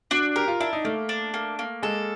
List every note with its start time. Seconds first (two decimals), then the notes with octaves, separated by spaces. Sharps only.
0.11 D4 F#4
0.36 G4 A#4
0.48 F4
0.60 D4 E4
0.73 D#4
0.85 A3 A#3
1.09 D4
1.34 A#3
1.59 A#3
1.83 G#3 A4